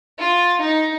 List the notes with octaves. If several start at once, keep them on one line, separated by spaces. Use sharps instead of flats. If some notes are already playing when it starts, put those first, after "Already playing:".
F4
D#4